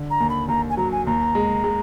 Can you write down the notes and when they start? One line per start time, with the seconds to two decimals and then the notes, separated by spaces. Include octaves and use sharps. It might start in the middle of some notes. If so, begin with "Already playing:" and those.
Already playing: D3
0.10 A#5
0.20 D#2
0.30 B5
0.48 D#2 A#5
0.70 G#5
0.77 F#3 A#5
0.92 G#5
1.06 D#2 A#5
1.35 G#3
1.64 G#3